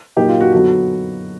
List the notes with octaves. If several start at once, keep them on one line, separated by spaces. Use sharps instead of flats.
A#2 F#3 A#3 D#4 G4
F4
F#4
D3 F#3 B3 D#4 F#4